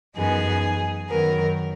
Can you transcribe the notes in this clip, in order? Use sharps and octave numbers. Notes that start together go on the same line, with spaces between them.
F#2 E3 B3 D#4 G#4
F#2 D#3 F#3 B3 A#4